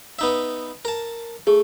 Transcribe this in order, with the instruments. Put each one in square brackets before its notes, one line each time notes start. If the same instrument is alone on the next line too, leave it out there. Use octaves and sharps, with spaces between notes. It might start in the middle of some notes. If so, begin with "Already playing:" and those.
[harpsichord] B3 D#4 E5
A#4 A5
[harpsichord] A3 [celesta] G#4